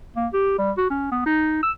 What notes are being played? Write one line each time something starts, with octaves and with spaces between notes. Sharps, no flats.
A#3
G4
G3
F#4
C#4
B3
D#4
E6